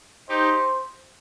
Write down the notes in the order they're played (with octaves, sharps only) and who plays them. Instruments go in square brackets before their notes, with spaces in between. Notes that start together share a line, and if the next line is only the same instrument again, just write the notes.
[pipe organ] D#4 G4 [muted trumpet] C5